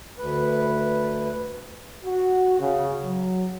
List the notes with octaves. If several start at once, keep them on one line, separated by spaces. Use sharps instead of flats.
D2 B4
F#4
C#3
F#3